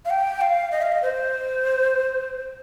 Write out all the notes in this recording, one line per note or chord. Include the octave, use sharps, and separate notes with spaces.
F5
G5
F5
D#5
F5
D#5
C5